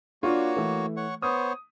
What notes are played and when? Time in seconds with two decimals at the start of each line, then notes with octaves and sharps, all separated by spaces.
0.23 A#3 D4 F4 F#4 C#5
0.57 E3 A3
0.97 C#5 F#5 C#6
1.22 B3 C5 C#5 D#6